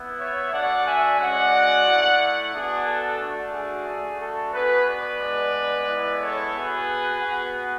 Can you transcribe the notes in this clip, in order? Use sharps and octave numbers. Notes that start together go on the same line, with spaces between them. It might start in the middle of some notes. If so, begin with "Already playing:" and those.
Already playing: B3 E4
C#5 E5
A3 D4 F#4 D5 F#5
E5 G#5
G#3 C#4 F#4 D5 F#5
A3 E4
B3 D4 F#4 G#4
A4
A3 D4 F#4
G#4
A3 D4 F#4
A4
B3 F#4 G#4 B4
B4 D5
G#3 B3 D4
G#3 B3 E4
A4 C#5
B3 F#4 G#4 B4
B3 F#4